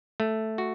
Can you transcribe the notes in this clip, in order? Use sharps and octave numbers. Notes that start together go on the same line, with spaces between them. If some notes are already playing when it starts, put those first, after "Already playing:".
A3
F#4